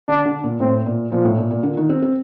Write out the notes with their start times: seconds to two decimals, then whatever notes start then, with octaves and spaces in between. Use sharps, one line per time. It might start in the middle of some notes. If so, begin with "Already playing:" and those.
0.08 D3 D4
0.25 D3
0.44 A#2
0.60 A2 C4
0.86 A#2
1.11 A#2 F3
1.25 A2
1.37 A#2
1.51 A#2
1.63 A#2 D3
1.77 D#3
1.89 C4
2.02 C4